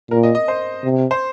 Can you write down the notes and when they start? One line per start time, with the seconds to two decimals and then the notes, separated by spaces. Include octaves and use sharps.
0.11 A#2 A#4
0.23 D#5
0.35 D#5
0.48 C5
0.84 C3
1.11 C5